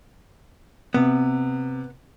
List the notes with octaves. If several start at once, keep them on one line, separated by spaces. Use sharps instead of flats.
C3 B3